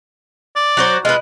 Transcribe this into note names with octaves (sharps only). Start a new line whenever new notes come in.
D5
F#3 F#4 C5
G#3 F4 B4